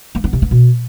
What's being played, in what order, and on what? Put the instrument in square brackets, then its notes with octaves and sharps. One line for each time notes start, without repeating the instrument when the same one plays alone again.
[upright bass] A#3
B3
C3
B3
B2